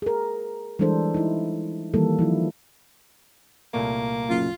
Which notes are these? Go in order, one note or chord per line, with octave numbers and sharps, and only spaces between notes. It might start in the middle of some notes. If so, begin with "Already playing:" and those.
G#4 A#4
E3 G3 G#3 D4 A4 C5
D#4 E4
D#3 E3 G3 A#3 A4
F3 D#4 E4
C2 A#2 A3 A#3
F#1 F4